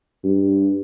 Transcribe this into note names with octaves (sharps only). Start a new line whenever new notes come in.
G2